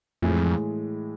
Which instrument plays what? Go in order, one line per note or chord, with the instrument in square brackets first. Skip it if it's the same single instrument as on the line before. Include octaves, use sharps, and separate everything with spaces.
[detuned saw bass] F2 [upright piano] A2 E3 G#3